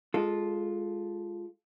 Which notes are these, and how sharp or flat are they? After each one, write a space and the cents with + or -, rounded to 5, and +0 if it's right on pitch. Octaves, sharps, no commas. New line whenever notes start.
G#3 +0 F4 +0 A4 -15